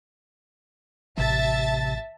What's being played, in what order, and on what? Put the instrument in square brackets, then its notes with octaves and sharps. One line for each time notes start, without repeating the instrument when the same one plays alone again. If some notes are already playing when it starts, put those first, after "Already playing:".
[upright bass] A1 [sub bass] C3 [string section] E5 A5 A6